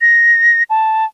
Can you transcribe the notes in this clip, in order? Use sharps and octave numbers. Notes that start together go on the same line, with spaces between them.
A#6
A5